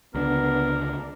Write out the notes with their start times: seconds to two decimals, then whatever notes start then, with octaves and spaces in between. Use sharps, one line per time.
0.15 C#2 D3 B3 D4 A#4